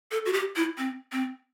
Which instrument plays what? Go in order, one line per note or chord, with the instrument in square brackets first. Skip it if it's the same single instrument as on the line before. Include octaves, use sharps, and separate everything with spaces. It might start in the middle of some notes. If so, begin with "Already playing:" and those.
[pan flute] A4
F#4
G4
E4
C4
C4